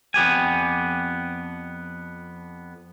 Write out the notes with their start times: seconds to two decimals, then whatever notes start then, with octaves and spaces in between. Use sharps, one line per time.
0.14 F2 B3 G4 G#5